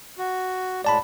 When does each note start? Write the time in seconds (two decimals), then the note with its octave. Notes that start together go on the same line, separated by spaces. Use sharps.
0.18 F#4
0.85 A2 G#3 D5 A5 B5